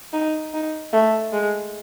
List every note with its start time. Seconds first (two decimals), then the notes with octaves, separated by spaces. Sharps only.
0.13 D#4
0.54 D#4
0.93 A3
1.32 G#3